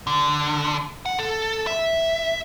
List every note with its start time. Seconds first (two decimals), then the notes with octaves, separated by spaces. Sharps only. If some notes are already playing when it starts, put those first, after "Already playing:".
0.07 D3
1.06 F#5
1.19 A4
1.67 E5